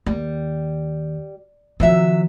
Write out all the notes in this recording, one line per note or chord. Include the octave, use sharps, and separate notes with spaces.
D#2 G3
C3 D#3 F3 F#3 E5